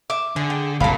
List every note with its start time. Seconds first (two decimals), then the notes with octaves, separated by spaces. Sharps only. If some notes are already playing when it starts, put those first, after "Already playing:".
0.10 E5 D6
0.36 D3 G#4
0.50 G5
0.80 F#1 C2 A#2 A4 F5 B5